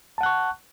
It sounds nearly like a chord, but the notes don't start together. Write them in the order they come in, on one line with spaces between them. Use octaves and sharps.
A5 F#5 F#6 C#6